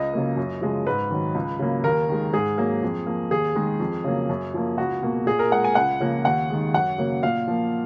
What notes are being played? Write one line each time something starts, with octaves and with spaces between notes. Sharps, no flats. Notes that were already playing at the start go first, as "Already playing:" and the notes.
Already playing: C#2 D#5
C#3 F#3 A#3
F#2
C#3 F3 G#3
G#2 B4
D#3 F#3
C#2
C#3 F#3 A#3
D#2 A#4
D#3 G#3
G#2 G#4
F#3 A#3
F2
F3 A#3
D#2 G#4
D#3 G#3
F2
C#3 F#3 A#3
F#2
F3 A#3
C#2 F#4
B2 A#3
A#2 G#4
A#4
G#3 F#5
G#5
C#2 F#5
C#3 F3 A#3
D#2 F#5
D#3 G#3
F#2 F#5
C#3 F#3 A#3
A#2 F5
F3 A#3